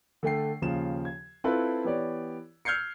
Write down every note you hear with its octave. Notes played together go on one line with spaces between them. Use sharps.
D3 A3 G5 C7
D#2 C#3 F3 E7
G#6
C4 E4 F4 A4 B4
E3 B3 G4 C#5 D5
E6 F6 G6 G#6 C7 C#7